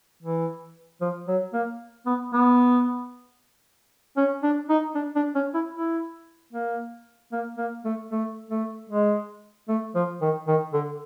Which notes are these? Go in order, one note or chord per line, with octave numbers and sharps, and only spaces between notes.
E3
F3
F#3
A#3
B3
B3
C#4
D4
D#4
D4
D4
C#4
E4
E4
A#3
A#3
A#3
A3
A3
A3
G#3
A3
F3
D#3
D#3
D3